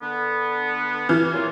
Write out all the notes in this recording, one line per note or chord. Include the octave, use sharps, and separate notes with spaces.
D3 B3
G2 E3 F6
A#2 F#3 F4